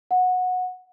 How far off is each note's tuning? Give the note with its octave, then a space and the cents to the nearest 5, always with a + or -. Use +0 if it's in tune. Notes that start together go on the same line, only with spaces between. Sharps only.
F#5 -15